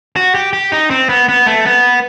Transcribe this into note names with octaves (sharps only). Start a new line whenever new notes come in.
F#4
G4
G4
D#4
C4
B3
B3
A3
B3